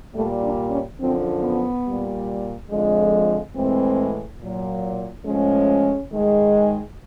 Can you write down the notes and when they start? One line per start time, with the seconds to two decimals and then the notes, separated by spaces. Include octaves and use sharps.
0.14 A#2 G3 A3
0.43 D4
0.71 C#4
0.99 F#2 D3 F3 C4
1.42 B3
1.85 A#2 G3
2.70 F2 D3 F3 G#3
3.56 A2 E3 G#3 C4
4.40 A#2 F#3
5.25 A2 F3 G#3 C#4
6.10 G#2 D#3 G#3